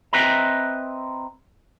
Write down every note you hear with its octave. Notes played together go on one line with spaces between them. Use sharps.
C4 B4 D#5 E5 A#5